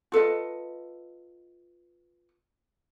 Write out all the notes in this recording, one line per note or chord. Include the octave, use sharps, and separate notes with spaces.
F4 A4 B4 D#5